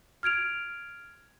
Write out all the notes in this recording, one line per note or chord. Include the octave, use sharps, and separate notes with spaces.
F6 G#6 D7 F7